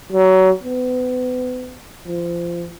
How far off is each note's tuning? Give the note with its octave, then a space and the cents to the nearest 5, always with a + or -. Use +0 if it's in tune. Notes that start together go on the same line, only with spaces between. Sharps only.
F#3 +25
B3 +35
F3 -25